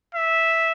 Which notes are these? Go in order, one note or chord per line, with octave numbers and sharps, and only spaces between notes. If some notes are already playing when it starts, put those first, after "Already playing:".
E5